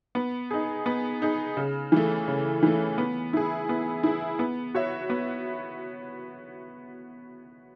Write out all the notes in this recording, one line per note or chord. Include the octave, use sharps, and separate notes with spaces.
B3
D#4 G#4
B3
D#4 G#4
C#3
E3 A3
C#3
E3 A3
B3
E4 G#4
B3
E4 G#4
B3
F#4 C#5 E5
B3